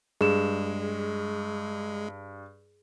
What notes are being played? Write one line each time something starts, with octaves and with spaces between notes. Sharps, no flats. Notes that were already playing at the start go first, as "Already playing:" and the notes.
G2 G#3 G#4 E7